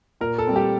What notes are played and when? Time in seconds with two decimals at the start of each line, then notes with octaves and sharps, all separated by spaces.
0.21 A#2 A#4
0.38 A4
0.47 G3 C4
0.56 G4